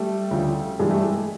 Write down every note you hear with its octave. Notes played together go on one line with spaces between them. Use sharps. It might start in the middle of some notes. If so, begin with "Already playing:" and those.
Already playing: G3 A3
D2 C#3 F3
G2 E3 G3 G#3
A3
G#3